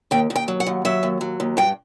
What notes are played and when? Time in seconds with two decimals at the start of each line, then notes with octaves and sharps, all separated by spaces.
0.11 D#2 G5
0.30 D#2
0.36 G5
0.48 F#3
0.60 F#5
0.66 D#2
0.85 F#3 E5
1.03 D#2
1.21 F#3
1.40 D#2
1.57 G2 G5